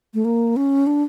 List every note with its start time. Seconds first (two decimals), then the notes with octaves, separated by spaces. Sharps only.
0.14 A3
0.25 A#3
0.56 C#4
0.87 D4